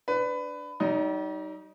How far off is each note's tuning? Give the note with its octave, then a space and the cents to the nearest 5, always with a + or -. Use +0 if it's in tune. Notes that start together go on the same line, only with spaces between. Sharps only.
D4 +0 B4 +20
G3 -45 D#4 +0